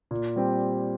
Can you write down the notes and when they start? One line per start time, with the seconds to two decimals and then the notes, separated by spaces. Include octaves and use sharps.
0.11 A#2
0.36 G3 C4 G4